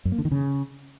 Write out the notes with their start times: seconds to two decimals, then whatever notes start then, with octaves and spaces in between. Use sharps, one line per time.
0.05 F#2
0.12 A#3
0.18 D3
0.25 D#3
0.32 C#3